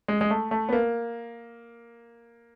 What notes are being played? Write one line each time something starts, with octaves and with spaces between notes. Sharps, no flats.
G#3
G#3
A3
A3
B3
A#3